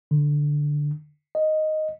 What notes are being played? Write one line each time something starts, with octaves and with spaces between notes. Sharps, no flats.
D3
D#5